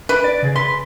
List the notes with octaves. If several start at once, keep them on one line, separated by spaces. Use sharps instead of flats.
D4 B4
D5
C#3 G#4
B4 C6